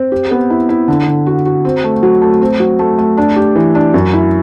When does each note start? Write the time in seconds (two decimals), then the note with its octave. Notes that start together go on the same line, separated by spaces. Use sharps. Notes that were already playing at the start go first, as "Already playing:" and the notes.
Already playing: C4
0.12 G4
0.31 B3
0.50 E4
0.69 E4
0.88 D3
1.08 D3
1.26 F#4
1.46 F#4
1.65 C4
1.84 A3
2.03 F#3
2.22 A3
2.41 C4
2.60 F#3
2.79 A3
2.98 A3
3.17 D4
3.36 G4
3.55 E3
3.75 D4
3.94 F#2
4.13 E4